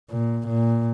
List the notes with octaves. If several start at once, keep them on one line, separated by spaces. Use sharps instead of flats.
A#2
A#2